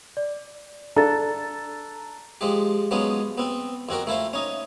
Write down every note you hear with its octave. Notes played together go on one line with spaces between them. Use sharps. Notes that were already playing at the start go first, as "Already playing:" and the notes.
D5
D4 A4 A#5 A6
F3 G#3 G4
F3 F#3 G#3 B3 C#4
B3 C4
F2 C4 F#4 A#4
A3 E4 F4 C5
C#4 D#4